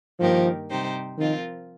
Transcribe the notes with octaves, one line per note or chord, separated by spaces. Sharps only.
G2 D#3 F3 A#3 G4 A#4
C3 G3 D#4 G4 C5
D#3 F3 C4 F4 A#4